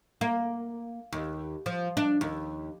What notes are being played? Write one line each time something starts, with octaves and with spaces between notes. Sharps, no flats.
A#3
D#2
F3
D4
D#2